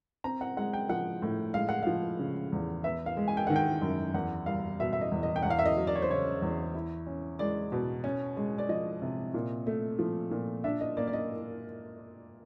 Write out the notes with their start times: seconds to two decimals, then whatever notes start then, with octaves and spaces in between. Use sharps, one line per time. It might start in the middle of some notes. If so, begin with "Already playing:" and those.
0.24 C4 A#5
0.41 F#5
0.57 G#3 F#5
0.73 G5
0.89 F3 F#5
1.22 A2
1.54 G#3 F5
1.69 F#5
1.83 F3 F5
2.19 C#3
2.52 E2
2.84 B3 E5
3.06 F5
3.17 G#3
3.28 G#5
3.37 G5
3.47 D#3 F#5
3.56 G5
3.82 F#2
4.14 E2 F#5
4.46 G3 F5
4.80 B2 E5
4.93 E5
5.01 D#5
5.12 E2
5.23 D#5
5.36 G5
5.43 E2 F#5
5.50 F5
5.59 E5
5.66 D#5
5.77 F#3
5.87 D5
5.96 C#5
6.02 C5
6.09 C#3 C#5
6.42 E2
6.75 E4
7.07 C#4
7.39 G#3 D5
7.72 B2
8.04 C#4
8.37 G#3
8.58 D5
8.69 F3 D#5
9.02 C3
9.34 A#2
9.67 A3
9.99 F3
10.31 A#2
10.64 D4 E5
10.81 D#5
10.97 A#3 D5
11.07 D5
11.13 D#5